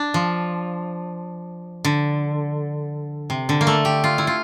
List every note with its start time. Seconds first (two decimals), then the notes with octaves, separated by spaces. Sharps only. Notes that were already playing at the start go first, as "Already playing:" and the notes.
Already playing: D4
0.14 F3
1.85 D3
3.30 C3
3.49 D3
3.61 A#3
3.67 A3
3.85 G4
4.04 F4
4.18 E4
4.27 F4